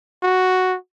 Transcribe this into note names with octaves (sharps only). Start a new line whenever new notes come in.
F#4